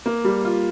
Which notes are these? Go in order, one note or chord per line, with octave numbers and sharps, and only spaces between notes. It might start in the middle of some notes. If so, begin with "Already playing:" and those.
A#3
G3
F4